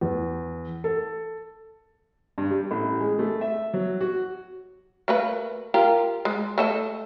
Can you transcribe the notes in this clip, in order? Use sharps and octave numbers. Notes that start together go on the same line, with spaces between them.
E2
A4
G2
G3
A1
G#3
A3
E5
F#3
F#4
A3 A#3 B4
F4 G4 A#4
G#3
A3 A4 D#5